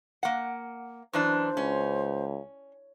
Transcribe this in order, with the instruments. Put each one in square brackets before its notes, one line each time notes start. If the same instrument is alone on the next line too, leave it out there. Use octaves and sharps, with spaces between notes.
[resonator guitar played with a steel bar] A#3 F#5
[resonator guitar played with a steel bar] F#2 E3 D4 [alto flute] C5
[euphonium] C#2 [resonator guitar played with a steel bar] C#4